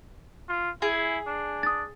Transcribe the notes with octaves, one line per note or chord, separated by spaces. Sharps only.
F4
E4 G#4
D4
D#6 A6